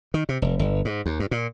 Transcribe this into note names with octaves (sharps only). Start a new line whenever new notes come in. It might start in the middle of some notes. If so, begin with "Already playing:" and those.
D#3
C3
F1
G1
G#2
D#2
G2
A#2